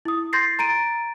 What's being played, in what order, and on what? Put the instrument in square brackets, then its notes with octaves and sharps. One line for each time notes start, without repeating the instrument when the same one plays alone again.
[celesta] E4 D#6
C6 G6 A6 A#6 C7
A#5 A6 D7 D#7